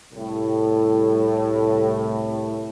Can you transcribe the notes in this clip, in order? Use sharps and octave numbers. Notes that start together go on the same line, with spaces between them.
C2 A2